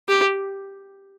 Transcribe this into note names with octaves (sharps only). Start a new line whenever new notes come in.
G4